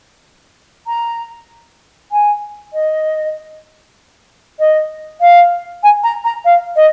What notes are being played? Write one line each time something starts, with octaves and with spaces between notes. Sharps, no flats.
A#5
G#5
D#5
D#5
F5
G#5
A#5
A#5
F5
D#5